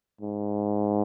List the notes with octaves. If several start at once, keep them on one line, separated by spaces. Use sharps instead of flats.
G#2